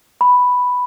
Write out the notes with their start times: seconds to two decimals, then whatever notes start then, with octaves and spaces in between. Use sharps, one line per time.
0.21 B5